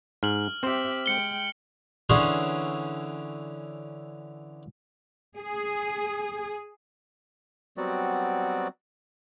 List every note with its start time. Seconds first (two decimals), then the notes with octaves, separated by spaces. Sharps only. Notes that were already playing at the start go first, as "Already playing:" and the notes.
0.23 G#2 F6 F#7
0.63 C4 G4 C5 E5
1.06 G#3 G5 C#7 G7
2.09 D3 E3 C#4 G#4 C6
5.38 G#4
7.77 F#3 G3 B3 C4 F#4 D5